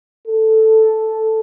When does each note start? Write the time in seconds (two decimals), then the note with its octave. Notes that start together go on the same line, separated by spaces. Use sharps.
0.27 A4